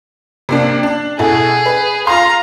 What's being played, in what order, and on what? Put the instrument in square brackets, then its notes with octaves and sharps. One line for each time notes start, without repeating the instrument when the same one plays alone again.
[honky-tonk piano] C3 A#3 D4
D4
[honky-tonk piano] B2 E4 A4 [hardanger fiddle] G#4
[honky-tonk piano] B4
[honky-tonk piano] F4 C6 [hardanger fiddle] F5 A#5